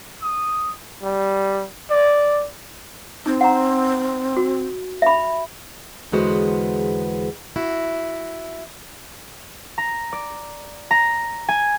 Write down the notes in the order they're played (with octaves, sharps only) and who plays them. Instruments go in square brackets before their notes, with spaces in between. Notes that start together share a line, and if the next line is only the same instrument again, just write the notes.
[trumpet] D#6
G3
D5
[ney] C4 [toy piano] D#4
[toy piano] F#5 A#5
F#4
E5 B5
[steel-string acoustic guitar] E2 D3 G#3 B3 F#4 C5
E4 F#4
[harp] A#5
D5
A#5
G#5